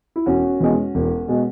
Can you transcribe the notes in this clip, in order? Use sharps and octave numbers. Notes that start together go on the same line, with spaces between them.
E4
E1 C#4 F#4
E2 B2 G#3
E1
B2 G#3